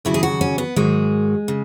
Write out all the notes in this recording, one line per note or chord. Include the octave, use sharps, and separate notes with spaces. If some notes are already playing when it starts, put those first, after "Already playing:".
D#2 C#3 F#3 E4
G#4
F#4
C#4
B3
G#2 D#3 F#3 G#3
C#3